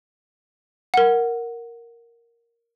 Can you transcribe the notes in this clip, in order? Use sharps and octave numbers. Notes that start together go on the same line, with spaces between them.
A#4 F#5